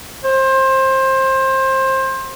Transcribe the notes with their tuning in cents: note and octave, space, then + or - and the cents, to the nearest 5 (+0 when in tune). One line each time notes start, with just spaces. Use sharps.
C5 +20